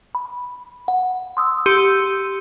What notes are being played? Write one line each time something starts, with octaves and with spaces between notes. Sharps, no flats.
B5
F#5
C6 D#6 E6
G4 C6 E6 G6 C#7 D#7